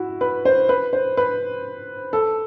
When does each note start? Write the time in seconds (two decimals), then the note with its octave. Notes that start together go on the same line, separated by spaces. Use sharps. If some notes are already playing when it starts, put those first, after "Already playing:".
Already playing: E4 F#4
0.21 B4
0.45 C5
0.69 B4
0.93 C5
1.17 B4
2.13 A4